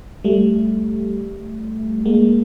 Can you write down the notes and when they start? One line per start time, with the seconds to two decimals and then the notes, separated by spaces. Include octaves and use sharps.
0.24 G3 A3
2.05 G#3 A#3